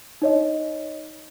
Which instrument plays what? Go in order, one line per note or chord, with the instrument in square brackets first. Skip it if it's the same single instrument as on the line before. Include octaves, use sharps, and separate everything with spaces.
[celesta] D#4 C#5 D#5